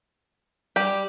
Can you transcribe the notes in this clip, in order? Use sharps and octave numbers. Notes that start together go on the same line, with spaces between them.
G3 G4